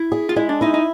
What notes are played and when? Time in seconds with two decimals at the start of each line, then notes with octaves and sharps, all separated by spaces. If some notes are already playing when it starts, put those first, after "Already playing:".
Already playing: E4
0.12 G#4
0.29 F4
0.36 G#3 E4
0.49 D4
0.61 D#4 E4
0.74 D#4